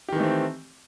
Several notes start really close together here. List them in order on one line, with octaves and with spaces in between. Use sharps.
G4 D#3 E3 A3 C4